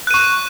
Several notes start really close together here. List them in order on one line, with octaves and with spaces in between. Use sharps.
F#6 D#7 C#6